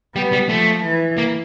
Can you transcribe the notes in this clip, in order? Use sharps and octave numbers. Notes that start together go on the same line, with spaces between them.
G3 B3
G3
F3 A3
E3
A#3